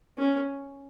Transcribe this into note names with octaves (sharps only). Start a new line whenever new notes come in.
C#4